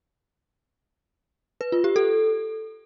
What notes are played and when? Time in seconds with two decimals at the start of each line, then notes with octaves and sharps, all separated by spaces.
1.61 B4
1.72 F4
1.84 G4
1.96 A4